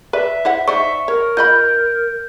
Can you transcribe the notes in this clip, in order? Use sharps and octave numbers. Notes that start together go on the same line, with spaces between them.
B4 D5 E5
E4 C5 F#5
D#4 C5 D5 E5 C#6
A#4 C#5
F4 D#5 B5 G6